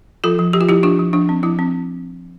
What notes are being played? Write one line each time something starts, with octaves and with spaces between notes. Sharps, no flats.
F3 F4 A4
F3
F3 G4
F4
F3 E4 G4
F3 D4 F4
F3
F3 D4
C4
F3 E4
C4